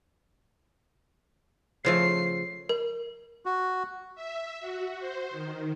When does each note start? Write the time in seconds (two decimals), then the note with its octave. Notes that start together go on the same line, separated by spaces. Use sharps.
1.85 C#3 F3 A3 C7
2.69 A#4
3.46 F#4
4.15 E5
4.60 F#4
5.00 C5
5.31 D#3